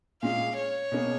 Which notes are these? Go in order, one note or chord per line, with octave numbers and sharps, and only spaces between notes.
A#2 G#3 C#4 G#4 F5
C#5
B2 A#3 C#4 G#4